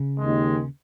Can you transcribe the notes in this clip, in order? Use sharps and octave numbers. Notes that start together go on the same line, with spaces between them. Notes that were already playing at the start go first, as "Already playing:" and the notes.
Already playing: C#3
D#2 D#3 G#3